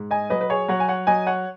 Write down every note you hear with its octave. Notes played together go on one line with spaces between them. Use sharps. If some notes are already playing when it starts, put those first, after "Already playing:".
Already playing: G#2
D#5 G#5
F#3 B4 D#5
B4
G#4 C#5
F#3 C#5 F#5
G#5
C#5 F#5
F#3 D#5 G#5
C#5 F#5